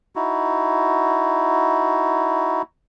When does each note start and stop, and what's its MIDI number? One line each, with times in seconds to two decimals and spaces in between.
0.16 2.62 63
0.16 2.62 64
0.16 2.62 66